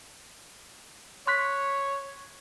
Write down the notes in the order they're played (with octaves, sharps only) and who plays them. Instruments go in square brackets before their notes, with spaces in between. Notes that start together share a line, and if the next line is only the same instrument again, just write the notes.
[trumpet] C#5 [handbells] C6 F#6 B6